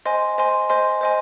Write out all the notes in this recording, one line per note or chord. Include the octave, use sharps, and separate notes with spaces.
C5 D#5 G#5 C6
C5 D#5 G#5 C6
C5 D#5 G#5 C6
C5 D#5 G#5 C6